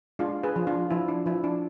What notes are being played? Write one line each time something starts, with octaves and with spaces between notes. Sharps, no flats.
G#3 D4 F4
G#4 B4
F3
D4 F4
F3 E4
D4
F3 E4
D4